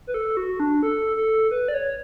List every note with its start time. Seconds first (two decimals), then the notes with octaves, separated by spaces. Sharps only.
0.07 B4
0.14 A4
0.37 F#4
0.60 D4
0.83 A4
1.17 A4
1.51 B4
1.68 D5
1.74 C#5